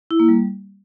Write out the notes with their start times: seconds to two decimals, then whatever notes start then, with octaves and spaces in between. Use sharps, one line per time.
0.11 E4
0.20 A#3
0.29 G3